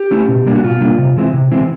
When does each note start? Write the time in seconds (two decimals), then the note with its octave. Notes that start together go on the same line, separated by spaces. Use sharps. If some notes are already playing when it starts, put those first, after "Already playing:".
Already playing: G4
0.11 A3 C#4 E4
0.29 B2
0.46 G3 A#3 D4
0.55 F#4
0.64 B2 F4
0.81 G3 A#3 D4
0.98 C3
1.16 E3 G#3 C4 E4
1.33 C3
1.52 E3 G#3 C4 E4